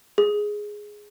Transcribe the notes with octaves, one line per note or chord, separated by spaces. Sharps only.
G#4